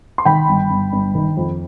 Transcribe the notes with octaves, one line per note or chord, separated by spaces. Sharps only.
C6
D#3 G5 B5
G1
G1
G1
D#3
F2